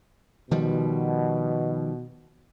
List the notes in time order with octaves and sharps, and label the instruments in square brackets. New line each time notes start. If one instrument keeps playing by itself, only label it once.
[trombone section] B2 [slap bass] D#3 F3 G3